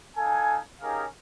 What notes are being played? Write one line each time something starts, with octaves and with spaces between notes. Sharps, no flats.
D#4 A4 F5 G#5
C#4 D#4 G4 G#4 A#4 F5